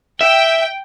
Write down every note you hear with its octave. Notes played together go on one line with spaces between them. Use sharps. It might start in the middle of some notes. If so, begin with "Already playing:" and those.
E5 G5